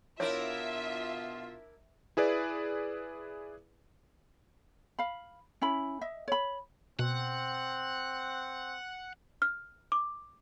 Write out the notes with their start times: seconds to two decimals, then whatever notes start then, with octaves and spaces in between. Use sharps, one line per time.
0.20 B2 D4 E4 F4 A#4 C#5 E5
2.17 E4 G#4 B4 D5
4.99 F5 B5
5.62 C#4 E4 B5
6.01 D#5 E5
6.28 C#5 B5
6.99 B2 C4 F#5
9.42 F6
9.92 D6